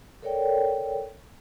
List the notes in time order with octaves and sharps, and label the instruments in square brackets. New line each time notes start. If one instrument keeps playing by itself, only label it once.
[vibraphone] A4 A#4 C#5 D5 G5